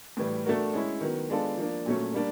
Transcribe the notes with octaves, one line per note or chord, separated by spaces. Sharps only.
A2 E3 G3
A3 D4 F#4 A#4
G#3 C#4 E4
D#3 F#3 B3
G#3 B3 D4 F4 A4
F3 A#3 D4
A#2 F#3 A3 C#4
G3 A#3 D4